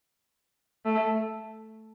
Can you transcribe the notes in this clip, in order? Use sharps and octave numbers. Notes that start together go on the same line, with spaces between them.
A3